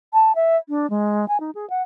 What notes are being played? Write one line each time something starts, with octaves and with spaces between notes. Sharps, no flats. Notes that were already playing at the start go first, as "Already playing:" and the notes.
A5
E5
D4
G#3
G#5
D#4
G#4
F#5